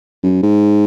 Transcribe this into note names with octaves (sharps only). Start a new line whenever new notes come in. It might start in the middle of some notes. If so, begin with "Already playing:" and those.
F#2
G#2